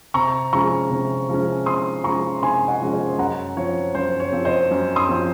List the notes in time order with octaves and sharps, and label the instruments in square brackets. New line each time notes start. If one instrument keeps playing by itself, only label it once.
[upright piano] C3 A#5 C#6
F3 G#3 C#4 A#5 C#6
C3
F3 G#3 C#4
C3 C6 D#6
F3 G#3 C#4 A#5 C#6
C3 G#5 C6
D#5 F#5
F3 G#3 C#4
C5 D#5
F#2 F#5 A#5
F3 C4 C#5
F#2 C5
C#5
F3 C4
C5 D#5
F#2
C6 D#6
F3 C4